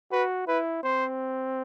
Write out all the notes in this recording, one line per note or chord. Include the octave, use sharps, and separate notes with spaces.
F#4 B4
E4 B4
C4 C5